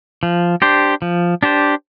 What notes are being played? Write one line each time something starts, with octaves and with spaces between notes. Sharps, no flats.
F3
D4 G4 C5
F3
D4 G4 C5